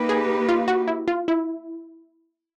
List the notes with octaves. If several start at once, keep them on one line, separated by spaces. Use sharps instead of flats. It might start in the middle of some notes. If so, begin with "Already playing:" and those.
Already playing: A#3 D#4 G4 B4
G#4
F4
F#4
E4
F4
E4